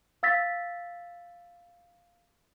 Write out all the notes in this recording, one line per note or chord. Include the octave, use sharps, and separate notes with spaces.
F5 E6 A6 B6